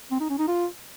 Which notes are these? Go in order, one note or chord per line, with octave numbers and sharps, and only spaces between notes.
C4
D#4
C#4
D#4
F4